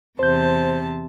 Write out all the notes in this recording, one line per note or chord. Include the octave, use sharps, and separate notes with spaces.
E2 C3 C5 A5 G6